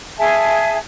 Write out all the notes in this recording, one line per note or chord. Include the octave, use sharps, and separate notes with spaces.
G#4 E5 G#5 A5